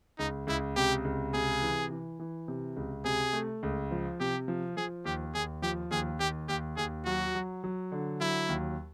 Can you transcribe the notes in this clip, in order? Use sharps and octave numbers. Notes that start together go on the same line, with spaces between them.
C#2 D#4
C#2 E4
C3 G4
C#2
C3 G#4
E3
E3
E3
C3
C#2
C3 G#4
A3
C#2
F3
C3 G4
F3
F3 G#4
D#2 G4
D#2 G#4
F3 G4
D#2 G#4
D#2 G4
D#2 G4
D#2 G#4
F#3 F#4
F#3
F#3
D3
F#3 E4
D#2